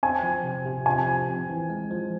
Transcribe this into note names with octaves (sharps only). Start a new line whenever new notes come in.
C4 G#5
F3
C3
C3
F3 G#5
F3
C4
E3
G#3
F3